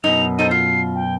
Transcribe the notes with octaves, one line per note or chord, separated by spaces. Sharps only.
F#2 B2 D#4 F7
D#4 A4 C5 D#7
F4 C7
G5